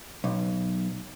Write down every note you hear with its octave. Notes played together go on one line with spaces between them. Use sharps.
B1